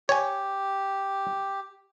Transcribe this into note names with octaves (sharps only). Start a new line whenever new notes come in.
G4 C#5 G#5